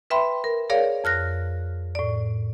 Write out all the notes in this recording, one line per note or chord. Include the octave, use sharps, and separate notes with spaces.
B4 E5 G5 B5 C6
A#4
G#4 A#4 C#5 D5 F5
F2 F6 F#6 A#6
A2 D5